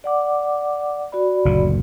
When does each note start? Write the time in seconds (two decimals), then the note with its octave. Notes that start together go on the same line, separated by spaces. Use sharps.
0.04 D5 F#5 D6
1.12 F#4 D5 B5
1.45 F#1 D2 A#2